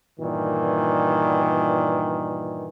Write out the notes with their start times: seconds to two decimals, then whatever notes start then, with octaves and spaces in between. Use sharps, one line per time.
0.19 G2 A#2 D#3 E3